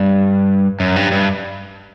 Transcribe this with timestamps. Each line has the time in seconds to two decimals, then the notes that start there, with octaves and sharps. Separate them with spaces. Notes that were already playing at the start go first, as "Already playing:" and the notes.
Already playing: G2
0.80 F#2
0.96 G2
1.12 G2